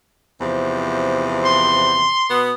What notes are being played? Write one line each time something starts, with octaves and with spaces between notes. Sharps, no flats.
E2 C3 F3
C6
B2 B3